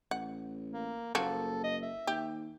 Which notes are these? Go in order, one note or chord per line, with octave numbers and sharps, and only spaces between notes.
A1 F#5
A#3
F#1 F3 A#3 F#4 A4
D#5
E5
D#2 G4